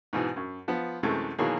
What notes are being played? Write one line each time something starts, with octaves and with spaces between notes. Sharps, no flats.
G#2 B2 E3
F#2
F3 B3
F#2 C3 E3 G#3 A3
B2 D#3 E3 F#3 A#3 G#4